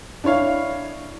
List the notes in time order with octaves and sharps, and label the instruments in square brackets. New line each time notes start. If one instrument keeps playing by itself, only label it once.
[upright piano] D4 E4 C#5 F5